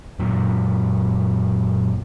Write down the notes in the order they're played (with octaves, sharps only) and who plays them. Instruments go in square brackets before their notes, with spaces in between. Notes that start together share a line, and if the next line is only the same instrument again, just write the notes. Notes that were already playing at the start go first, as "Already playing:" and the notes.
[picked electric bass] F#2 A#2